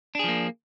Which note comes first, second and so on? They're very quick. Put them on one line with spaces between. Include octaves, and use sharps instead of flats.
D4 G#4 F3 A#3